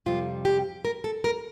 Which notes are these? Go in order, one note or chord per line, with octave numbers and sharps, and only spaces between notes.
F2 C3 G3 F4
G4
A#4
A4
A#4